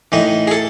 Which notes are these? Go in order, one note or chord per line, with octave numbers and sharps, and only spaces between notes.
A2 E3 D#4
G#4
A4